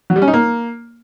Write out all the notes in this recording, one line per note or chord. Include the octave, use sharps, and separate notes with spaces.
F#3
G3
C#4
D#4
A#3